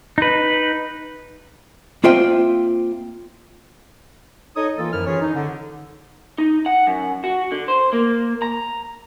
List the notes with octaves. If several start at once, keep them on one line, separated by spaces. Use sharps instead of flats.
D#4 B4
A#3 C4 F4 C5 E5 G5
D#4 A4 C#5 D#5 D#6
E3 A#3 F4 A4
F#2 D#3 F3 E4 F6
E3 C#4 F4 G#4 C#5
D#4
D3
D#4
F#5
F#2
F#4
D3
C5
A#3
A#5